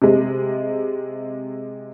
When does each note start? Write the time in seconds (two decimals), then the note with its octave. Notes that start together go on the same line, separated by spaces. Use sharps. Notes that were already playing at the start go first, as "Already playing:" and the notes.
0.02 C3 G#3